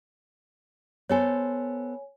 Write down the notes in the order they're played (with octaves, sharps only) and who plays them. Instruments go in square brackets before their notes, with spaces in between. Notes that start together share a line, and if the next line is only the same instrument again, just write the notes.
[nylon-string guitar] B3 A4 C5 [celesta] C#5 G#5